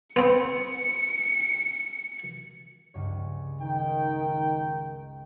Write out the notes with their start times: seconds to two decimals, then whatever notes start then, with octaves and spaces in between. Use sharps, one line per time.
0.16 B3 C4 C#7
2.94 C#2 G2 C#5
3.61 D#3 G5